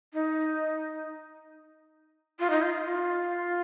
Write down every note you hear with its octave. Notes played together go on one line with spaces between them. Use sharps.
D#4
F4
D#4
F4
F4